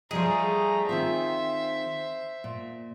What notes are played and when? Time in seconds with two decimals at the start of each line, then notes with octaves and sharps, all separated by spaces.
0.11 F3 G3 A3 G#4 D#5 A#5
0.89 D#3 C4 F4 C5 E5
2.44 A#2